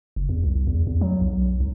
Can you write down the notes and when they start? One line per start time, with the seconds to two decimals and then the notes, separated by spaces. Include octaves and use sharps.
0.16 F#1
0.29 E2
0.44 C2
0.67 E2
0.87 E2
1.01 F#3
1.22 B1
1.60 C2